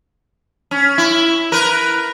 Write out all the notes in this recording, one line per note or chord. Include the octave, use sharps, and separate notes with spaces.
C#4
E4
A#4 B4